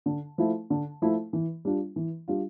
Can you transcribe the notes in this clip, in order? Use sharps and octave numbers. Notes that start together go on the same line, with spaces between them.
D3
F3 A3 E4
D3
F3 A3 E4
E3
G3 D4 F4
E3
G3 D4 F4